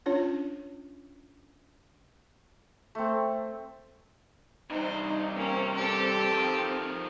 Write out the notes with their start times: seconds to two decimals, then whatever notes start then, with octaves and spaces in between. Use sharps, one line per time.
0.06 C#4 D4 F4 C#5
2.95 A3 C4
4.70 G2 C3 D#4 C5
5.36 A#3 C4 C#4
5.75 G4 A4
6.32 D#3 F3